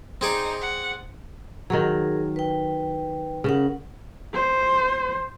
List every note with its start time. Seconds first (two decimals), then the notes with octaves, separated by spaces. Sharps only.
0.21 C4 D#4 G#4 D5
0.61 F#5
1.70 D#3 F#3 G#4 A#4
2.36 B4 G5
3.44 C#3 C#4 A#4 F#5
4.34 C5